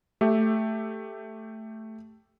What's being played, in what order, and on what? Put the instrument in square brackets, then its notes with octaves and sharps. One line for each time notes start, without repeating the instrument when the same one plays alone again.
[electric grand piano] A3 G4 E5